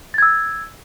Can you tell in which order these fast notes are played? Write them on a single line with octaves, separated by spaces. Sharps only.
A6 G#6 E6